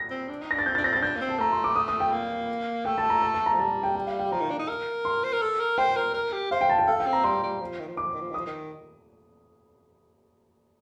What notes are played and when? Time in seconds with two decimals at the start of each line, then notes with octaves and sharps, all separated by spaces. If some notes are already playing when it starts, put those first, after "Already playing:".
Already playing: A#6
0.11 C4
0.29 D4
0.42 D#4
0.51 A#6
0.54 D4
0.59 A6
0.66 C4 G6
0.75 A6
0.78 D4
0.84 C4 A#6
0.93 A6
0.96 C4
1.02 D4 G6
1.16 A#3
1.21 C4
1.29 A5
1.39 A3 A#5
1.52 C6
1.64 D6
1.76 D#6
1.88 D#6
2.00 G5
2.12 A#3
2.85 A3 G5
2.98 A5
3.10 A#5
3.22 A5
3.34 A5
3.46 A#5
3.54 F3
3.59 G3 A5
3.83 G5
3.95 G5
4.07 F5
4.19 G5
4.31 F3 A#5
4.40 D#3
4.50 D4
4.59 D#4
4.68 A#4
5.05 C6
5.24 C5
5.33 A#4
5.42 A4
5.60 A#4
5.78 C5 G5
5.96 A#4
6.14 A#4
6.33 G4
6.51 C5 F5
6.61 G5
6.70 A5
6.78 G5
6.87 A4 F5
7.00 G5
7.07 C4
7.13 A#5
7.24 G3 C6
7.43 G3
7.61 F3
7.79 D#3
7.88 F3
7.97 D#3 D6
8.05 F3
8.14 D#3
8.21 F3
8.31 D#3
8.34 F3 D#6
8.47 D#3